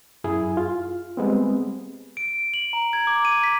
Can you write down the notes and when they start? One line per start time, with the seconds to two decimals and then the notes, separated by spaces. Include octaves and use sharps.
0.24 F#2 E4 G#4
0.57 F4
1.17 G3 G#3 B3 C4
2.17 D7
2.54 F#7
2.73 A#5
2.93 G#6
3.07 D6
3.25 D#7
3.44 B6